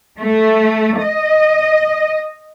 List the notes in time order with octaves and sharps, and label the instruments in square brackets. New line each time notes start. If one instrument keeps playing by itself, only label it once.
[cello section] A3
D#5